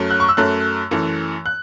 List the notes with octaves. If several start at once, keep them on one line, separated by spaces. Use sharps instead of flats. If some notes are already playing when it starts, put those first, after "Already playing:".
Already playing: F#2 F#3 A3
F#6
C#6
E6
F#2 F#3 A3 F#6
F#2 E3 A3
F#6